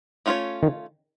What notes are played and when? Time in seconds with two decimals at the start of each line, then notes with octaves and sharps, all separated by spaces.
0.26 A3 C#4 F4 G#4 C#5
0.63 D#3